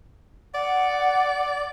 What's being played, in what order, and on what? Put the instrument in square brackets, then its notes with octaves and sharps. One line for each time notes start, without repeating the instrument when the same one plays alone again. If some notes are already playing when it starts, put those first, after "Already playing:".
[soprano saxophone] D5 [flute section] F#5